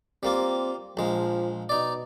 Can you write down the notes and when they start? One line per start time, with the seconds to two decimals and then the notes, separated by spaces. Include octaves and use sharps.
0.23 G3 A#3 C4 F4
0.97 A#1 F3 G#3
1.69 B2 D#4 D5